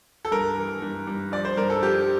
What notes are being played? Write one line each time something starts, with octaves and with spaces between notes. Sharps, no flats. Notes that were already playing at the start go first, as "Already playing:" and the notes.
A4
G2 A#4
E3
G2
G2
F3 D5
C5
G2 A#4
A4
F3 G4